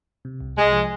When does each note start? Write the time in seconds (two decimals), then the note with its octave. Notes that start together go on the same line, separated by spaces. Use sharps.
0.25 C3
0.41 C2
0.57 C2 G#3
0.72 F3